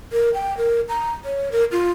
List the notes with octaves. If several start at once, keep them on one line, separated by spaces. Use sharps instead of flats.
A#4
G5
A#4
A#5
C#5
A#4
F4